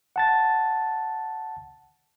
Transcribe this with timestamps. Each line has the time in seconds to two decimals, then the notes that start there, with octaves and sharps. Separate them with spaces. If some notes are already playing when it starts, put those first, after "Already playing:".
0.16 F#5 A5 A6